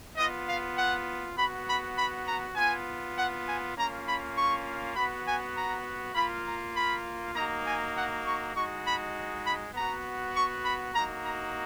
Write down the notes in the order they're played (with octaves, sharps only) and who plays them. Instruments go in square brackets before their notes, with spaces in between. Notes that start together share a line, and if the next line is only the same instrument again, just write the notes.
[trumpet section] B3 F4 D#5
F5
F#5
B3 F#4 B5
B5
B5
A#5
B3 F4 G#5
F#5
G#5
A#3 C#4 F4 A#5
B5
C#6
B3 F#4 B5
G#5
A#5
A#3 F4 B5
A#5
B5
A#3 D#4 F#4 A#5
G#5
F#5
C#6
G#3 D#4 F#4 C#6
B5
B5
B3 F#4 A#5
C#6
B5
A#3 D#4 F#4 A#5
A#5